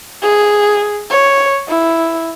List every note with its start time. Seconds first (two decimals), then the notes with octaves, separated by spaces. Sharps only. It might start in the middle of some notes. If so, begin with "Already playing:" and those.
0.22 G#4
1.10 C#5
1.68 E4